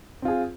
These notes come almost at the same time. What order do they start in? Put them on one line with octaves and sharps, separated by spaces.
C4 F4 G#4